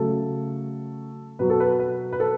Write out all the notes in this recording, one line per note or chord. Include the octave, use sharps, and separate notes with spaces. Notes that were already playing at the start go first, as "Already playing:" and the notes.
Already playing: C#3 F#3 A3 A4
B2 F#3 B3 B4
A4
B4
B4
B4
A4